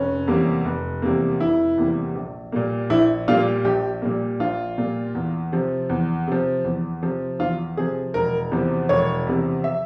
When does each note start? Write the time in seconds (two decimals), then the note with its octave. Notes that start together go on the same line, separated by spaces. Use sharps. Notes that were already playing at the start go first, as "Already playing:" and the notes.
Already playing: F1 C#4
0.28 E2 C3 G3 A#3
0.65 F1
1.02 E2 C3 G3 A#3
1.40 F1 E4
1.78 E2 C3 G3 A#3
2.15 A#1
2.52 A#2 G3 A#3
2.90 A#1 E4
3.28 A#2 G3 A#3 F4
3.64 A#1 G4
4.02 A#2 G3 A#3
4.40 A#1 F4
4.78 A#2 G3 A#3
5.15 E2
5.52 C3 F3
5.90 E2
6.27 C3 F3
6.65 E2
7.03 C3 F3
7.39 E2 F4
7.77 C3 F3 G#4
8.14 E1 A#4
8.52 E2 C3 F3
8.89 E1 C#5
9.27 E2 C3 F3
9.64 E5